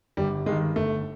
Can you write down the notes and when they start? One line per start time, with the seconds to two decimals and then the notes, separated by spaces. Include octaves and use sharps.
0.17 G1 G3
0.46 G2 D#3 G#3
0.76 G1 A3